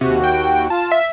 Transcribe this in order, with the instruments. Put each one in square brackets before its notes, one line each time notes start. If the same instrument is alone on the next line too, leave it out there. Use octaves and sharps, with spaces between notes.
[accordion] D#2 F#4 [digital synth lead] C3
[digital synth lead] G5
[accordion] F4 [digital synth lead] A5
[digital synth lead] E5